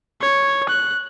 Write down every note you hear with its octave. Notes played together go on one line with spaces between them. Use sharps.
C#5
F#6